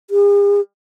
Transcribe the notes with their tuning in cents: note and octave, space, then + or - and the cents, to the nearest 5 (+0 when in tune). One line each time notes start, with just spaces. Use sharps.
G#4 -45